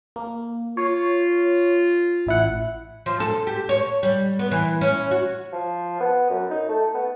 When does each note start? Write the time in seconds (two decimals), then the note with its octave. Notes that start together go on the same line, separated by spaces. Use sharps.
0.16 A#3
0.77 F4 C#5
2.26 A1 E4 F#5
3.06 F3
3.20 A4
3.47 G4
3.69 C#5
4.03 G3
4.39 B3
4.51 E3
4.81 C#4
5.11 F#4
5.53 F3
6.01 B3
6.30 F#2
6.51 D#4
6.69 A3
6.94 B3